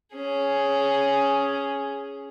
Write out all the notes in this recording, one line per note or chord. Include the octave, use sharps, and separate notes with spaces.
C#4 G#4